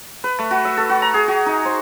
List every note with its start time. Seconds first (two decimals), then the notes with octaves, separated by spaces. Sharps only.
0.24 B4
0.39 A3
0.51 F#4
0.65 E5
0.77 A4
0.90 F#4
1.02 A#5
1.14 G#4
1.28 F#4
1.46 D#4
1.65 C5